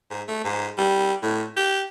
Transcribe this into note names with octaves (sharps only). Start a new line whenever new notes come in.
G#2
A3
G#2
G3
A2
G4